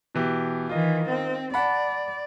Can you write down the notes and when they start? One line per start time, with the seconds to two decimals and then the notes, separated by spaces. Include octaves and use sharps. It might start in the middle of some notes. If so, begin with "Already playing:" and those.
0.15 B2 E3 G4
0.69 D#3 E3 F4 D#5
1.09 C4
1.54 D5 F#5 A5 B5